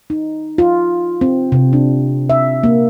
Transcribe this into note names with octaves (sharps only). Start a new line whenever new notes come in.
D#4
F4
C4
C3
D4
E5
A#3